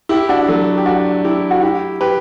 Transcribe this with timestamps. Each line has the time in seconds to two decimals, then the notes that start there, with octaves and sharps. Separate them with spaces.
0.09 E4 G4
0.29 D4 F#4
0.48 F#3 A3
0.77 G4
0.86 D4 F#4
1.24 E4 G4
1.51 F#4
1.62 E4 G4
2.01 G4 B4